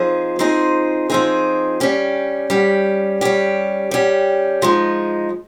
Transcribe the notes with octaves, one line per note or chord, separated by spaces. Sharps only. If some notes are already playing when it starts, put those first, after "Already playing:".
Already playing: F3 C4 D#4 G#4
F3 C4 D#4 G#4
F3 C4 D#4 G#4
G3 C#4 G4
G3 C#4 G4
G3 C#4 G4
G3 C#4 G4
F3 G#3 D#4